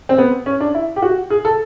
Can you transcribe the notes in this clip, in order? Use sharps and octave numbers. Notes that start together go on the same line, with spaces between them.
C4
B3
C#4
D4
E4
G4
F#4
G#4
A4